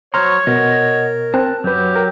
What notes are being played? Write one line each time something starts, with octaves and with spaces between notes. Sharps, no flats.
F#3 C5 C#5 A#5 C6 C#6 F6
B2 A#4 D#5 F#5
C4 A5 F#6
F#2 F#3 G4 B4
A#4 G5